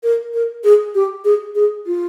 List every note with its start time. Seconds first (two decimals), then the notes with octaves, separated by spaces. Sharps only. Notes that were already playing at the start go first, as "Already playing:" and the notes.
0.03 A#4
0.34 A#4
0.64 G#4
0.95 G4
1.25 G#4
1.55 G#4
1.86 F4